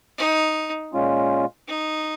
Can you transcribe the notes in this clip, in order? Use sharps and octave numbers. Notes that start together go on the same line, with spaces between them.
D#4
A#2 G#3 C#4 F4
D#4